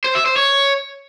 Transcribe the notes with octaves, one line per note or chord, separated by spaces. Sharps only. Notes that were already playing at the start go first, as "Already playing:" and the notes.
C5
E5
C5
C#5